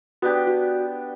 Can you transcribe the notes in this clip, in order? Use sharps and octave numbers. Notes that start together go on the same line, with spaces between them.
B3 D4 F#4 G4
F#4